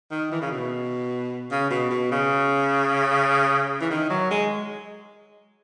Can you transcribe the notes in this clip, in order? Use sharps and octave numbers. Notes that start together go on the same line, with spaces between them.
D#3
E3
C#3
B2
C#3
B2
B2
C#3
E3
D#3
F#3
G#3